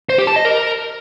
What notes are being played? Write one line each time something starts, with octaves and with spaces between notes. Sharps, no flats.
C5
G4
A5
D#5
A#4